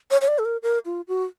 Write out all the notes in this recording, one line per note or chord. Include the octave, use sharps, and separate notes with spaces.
C#5
C#5
D5
A4
A#4
A#4
F4
F#4